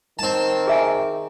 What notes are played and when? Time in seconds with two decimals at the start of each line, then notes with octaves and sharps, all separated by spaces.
0.19 D#3 C4 A5
0.67 G#4 E5 G#5